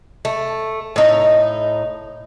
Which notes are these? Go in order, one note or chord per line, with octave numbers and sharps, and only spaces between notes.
A3
A2 D#4